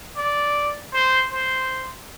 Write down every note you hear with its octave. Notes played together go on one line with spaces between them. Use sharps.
D5
C5
C5